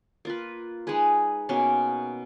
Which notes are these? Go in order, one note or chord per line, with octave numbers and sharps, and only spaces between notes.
A#3 F4 B4
G#3 D#4 G#4 B4
B2 A#3 C#4